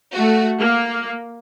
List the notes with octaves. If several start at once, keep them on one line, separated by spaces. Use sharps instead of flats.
A3 F#4
A#3